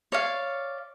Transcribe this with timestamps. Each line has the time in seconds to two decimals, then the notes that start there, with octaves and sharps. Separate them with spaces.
0.12 C#5 D5 F5